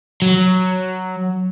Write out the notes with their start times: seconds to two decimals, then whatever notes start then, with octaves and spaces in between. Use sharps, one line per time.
0.22 F#3